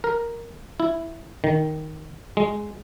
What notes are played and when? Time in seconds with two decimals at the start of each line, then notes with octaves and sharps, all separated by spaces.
0.04 A#4
0.80 E4
1.44 D#3
2.37 G#3